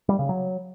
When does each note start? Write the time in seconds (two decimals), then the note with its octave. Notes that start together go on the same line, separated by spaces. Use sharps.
0.09 G3
0.19 C#3
0.29 F#3